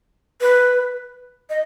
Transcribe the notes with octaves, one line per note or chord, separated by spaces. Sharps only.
B4
D#5